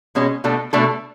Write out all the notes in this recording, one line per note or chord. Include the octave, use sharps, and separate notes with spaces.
B2 G#3 C#4
B2 A3 D4 A4
B2 A3 D4 A4